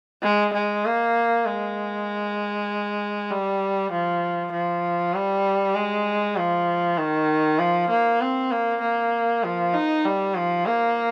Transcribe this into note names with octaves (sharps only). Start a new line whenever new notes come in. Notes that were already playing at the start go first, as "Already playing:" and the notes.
G#3
G#3
A#3
G#3
G3
F3
F3
G3
G#3
F3
D#3
F3
A#3
C4
A#3
A#3
F3
D#4
G3
F3
A#3